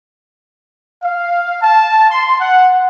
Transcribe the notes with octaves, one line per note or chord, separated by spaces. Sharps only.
F5
A5
C6
F#5